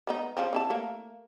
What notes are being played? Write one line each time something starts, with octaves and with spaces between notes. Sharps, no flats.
G#3 B3 D#4
C#3 F3 C4
C4 E4 A5
A3 A#3